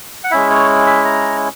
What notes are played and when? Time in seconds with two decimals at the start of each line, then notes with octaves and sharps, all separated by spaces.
0.24 F#5
0.31 G#3 C#4 E4 E5
0.51 C#5
0.87 E5
1.05 A#5